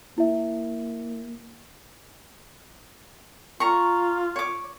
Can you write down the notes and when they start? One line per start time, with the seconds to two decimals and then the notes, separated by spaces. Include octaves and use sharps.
0.18 A#3 E4 E5
3.60 F4 A#5 C#6
4.36 C#5 D6